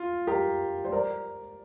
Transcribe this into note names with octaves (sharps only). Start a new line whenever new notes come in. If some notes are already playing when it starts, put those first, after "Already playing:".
Already playing: F4
G4 A#4
C5
A#4 D5